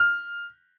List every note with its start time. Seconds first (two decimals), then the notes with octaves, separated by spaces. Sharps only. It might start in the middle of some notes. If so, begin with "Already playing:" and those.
Already playing: F6